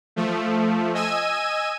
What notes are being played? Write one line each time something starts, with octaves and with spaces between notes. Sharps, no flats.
F3 A3
D#5 G#5 E6 D#7